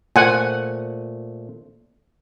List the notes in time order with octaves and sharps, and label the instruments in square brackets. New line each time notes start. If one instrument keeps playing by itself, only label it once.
[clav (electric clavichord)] A#2 A3 C5 [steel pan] F#5 G#5